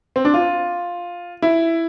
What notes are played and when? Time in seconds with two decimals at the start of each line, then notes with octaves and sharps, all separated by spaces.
0.16 C4
0.25 D4
0.34 F4
1.42 E4